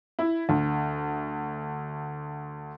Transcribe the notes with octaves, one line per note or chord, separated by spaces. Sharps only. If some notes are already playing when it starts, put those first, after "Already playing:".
E4
D2